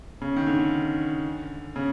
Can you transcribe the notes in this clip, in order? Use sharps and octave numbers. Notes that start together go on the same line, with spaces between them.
C#3
D#3
D3
C#3